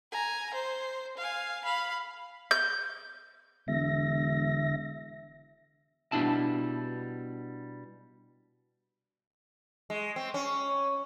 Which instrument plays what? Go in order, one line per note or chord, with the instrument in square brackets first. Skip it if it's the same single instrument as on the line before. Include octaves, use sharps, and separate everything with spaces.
[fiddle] G#5 A#5
C5
F5 G#5
F5 B5
[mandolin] G6
[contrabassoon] E1 [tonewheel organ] D3 E5 A#6
[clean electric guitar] B2 F#3 G3 D4 E4 A5
[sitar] G#3
C4
C#4